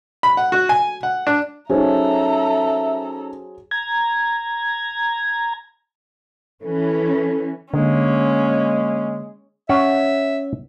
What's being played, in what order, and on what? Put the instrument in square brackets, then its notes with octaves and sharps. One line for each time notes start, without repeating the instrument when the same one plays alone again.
[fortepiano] B5
F#5
F#4
G#5
F#5
D4
[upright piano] F#3 G#4 C5 [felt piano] C#4 D#4 [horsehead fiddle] A4 A#5 [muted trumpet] E5
[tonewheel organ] A#5 G#6
[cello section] E3 C#4 [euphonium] A4
[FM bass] D3 [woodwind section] G#3 A#3 [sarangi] C#4
[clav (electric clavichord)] C#4 F#5 [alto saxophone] E5